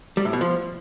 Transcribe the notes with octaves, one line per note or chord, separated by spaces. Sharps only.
G3
A2
B2
F3